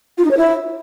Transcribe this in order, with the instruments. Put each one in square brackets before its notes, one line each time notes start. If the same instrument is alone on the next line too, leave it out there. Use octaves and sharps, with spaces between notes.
[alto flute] F4
D#4
C#5
E4